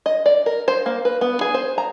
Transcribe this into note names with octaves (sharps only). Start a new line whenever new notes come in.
D#5
D5
A#4
C5
A#3
B4
B3
G#4
C5
A#5